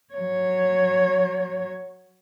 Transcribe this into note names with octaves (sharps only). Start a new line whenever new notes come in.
F#3 C#5